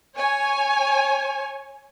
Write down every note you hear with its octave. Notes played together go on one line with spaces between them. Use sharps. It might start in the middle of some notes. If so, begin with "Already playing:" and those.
C#5 G#5